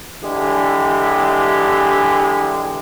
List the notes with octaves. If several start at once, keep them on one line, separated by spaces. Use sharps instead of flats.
D3 E3 G#3 G4